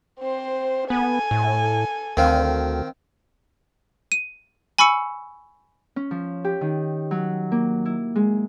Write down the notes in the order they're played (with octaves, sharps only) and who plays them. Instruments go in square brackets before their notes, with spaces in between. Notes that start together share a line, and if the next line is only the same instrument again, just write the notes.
[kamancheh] C4 C5
[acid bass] B3 [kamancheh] A4 G#5
[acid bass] A2
[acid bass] D2 [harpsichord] D#3 C4 F5
[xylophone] D#7
G#5 B5 C#6 E6 C#7
[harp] C#4
F3
G4
D#3
F#3
A#3
E4
G#3